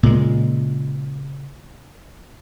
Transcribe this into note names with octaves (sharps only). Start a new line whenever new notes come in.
A#2 C#3 G#3